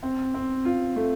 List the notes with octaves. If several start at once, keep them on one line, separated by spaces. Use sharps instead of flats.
C4
C4
F4
A3